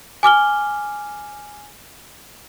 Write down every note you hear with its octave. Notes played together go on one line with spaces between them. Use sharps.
G#5 D6 F6 G7